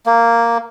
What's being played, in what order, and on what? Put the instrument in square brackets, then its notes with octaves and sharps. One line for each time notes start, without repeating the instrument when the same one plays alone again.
[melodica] A#3